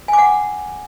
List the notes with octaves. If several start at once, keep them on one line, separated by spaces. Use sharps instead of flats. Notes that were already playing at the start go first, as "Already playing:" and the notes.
G#5
D6
F#5